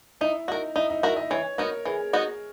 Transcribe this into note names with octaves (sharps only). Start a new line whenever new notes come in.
D#4 E4
D#4 F#4 A#4
D#4 E4
D#4
E4 F#4 A#4
D#5
E3 C#5
B3 D#4 F#4 A#4
E3 G#4
B3 D#4 F#4